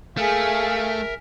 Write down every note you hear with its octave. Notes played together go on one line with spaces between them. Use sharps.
A3 G#4 A#4 E5 F5